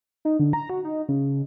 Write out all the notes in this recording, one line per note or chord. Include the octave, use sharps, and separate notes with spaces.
D#4
D3
A#5
F#4
D#4
C#3